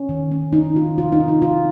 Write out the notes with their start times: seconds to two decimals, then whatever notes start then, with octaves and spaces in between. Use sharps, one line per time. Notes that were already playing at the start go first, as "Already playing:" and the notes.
Already playing: C#4
0.09 D#3
0.31 C#4
0.53 D#3 D#4
0.75 D#3 F4
0.98 C3 F4
1.12 D#4
1.20 C4
1.28 F4
1.42 C3 F4